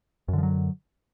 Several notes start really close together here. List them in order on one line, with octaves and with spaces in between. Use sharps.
F#2 D3 F3 F#3